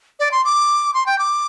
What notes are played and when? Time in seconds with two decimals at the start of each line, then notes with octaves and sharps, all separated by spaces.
0.20 D5
0.31 C6
0.45 D6
0.94 C6
1.06 G5
1.19 D6